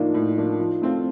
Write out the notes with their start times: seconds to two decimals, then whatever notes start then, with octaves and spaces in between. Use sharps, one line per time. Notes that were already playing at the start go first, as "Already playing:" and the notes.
Already playing: A2 F3 A#3 D4 D#4
0.14 A2
0.37 F3 A#3 D4
0.59 F3
0.81 A3 C4 F4